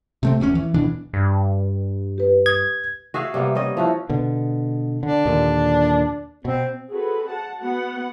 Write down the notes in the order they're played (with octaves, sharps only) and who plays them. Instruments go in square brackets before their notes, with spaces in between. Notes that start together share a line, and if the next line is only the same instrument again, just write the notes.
[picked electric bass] C3 A3 C4
D1 E2 D#3 C#4
E3
D1 B2 E3 D4
[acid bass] G2
[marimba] G4 B4
[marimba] D#6 [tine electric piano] G#6
[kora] F#4 G#4 E5 F5
C3 G3 A#3 B3
G3 C#4 D#5
F3 E4 F#4
[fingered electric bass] B2 D3
[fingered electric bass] D3 [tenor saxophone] D4
[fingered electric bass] D#2 A#2 D3
[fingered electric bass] B2 [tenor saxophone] C4
[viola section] C4 F#4 G#4 A4 B4
F#5 A5
B3 F#4 F#5